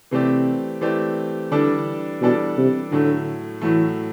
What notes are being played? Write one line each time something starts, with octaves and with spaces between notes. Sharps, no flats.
C3 E3 A3 C4 G4 D5
E3 A3 C4 G4 D5
D3 E3 G3 D4 A4 D5
B2 E3 G3 D4 A4 D5
C3
A2 D3 F#3 A3
A2 E3 F#3 A3